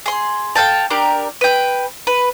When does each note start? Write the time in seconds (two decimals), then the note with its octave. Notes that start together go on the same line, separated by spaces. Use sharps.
0.06 G#4 C6
0.55 A4 F5 G5 A5
0.90 D4 G4 A#4
1.41 B4 G5
2.07 B4